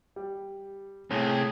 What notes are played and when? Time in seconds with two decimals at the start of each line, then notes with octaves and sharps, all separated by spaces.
0.16 G3
1.11 C2 A2 C3 G#4